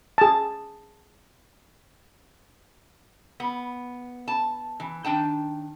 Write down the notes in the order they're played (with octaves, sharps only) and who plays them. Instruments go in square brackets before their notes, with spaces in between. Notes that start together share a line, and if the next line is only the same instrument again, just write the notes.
[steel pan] G#4 A5
[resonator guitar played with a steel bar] B3
A5
E3
D#3 D4 G5 A5